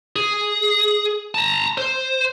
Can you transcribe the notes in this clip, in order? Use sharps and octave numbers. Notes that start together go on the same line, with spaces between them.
G#4
A5 A#5
C5